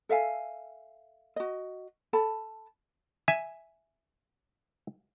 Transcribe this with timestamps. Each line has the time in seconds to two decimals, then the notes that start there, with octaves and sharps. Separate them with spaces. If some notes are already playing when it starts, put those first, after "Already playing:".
0.09 A4 E5 F5 G#5
1.36 F#4 D#5
2.13 A4 A5 B5
3.28 E5 G#5